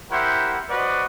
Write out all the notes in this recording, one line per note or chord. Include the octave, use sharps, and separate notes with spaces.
E4 G4 A#4 C5 E5 F#5
F#4 B4 C5 D5 D#5 F#5